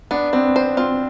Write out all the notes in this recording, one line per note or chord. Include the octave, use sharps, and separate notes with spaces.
B3 D4
B3 C4
C5
C4 F4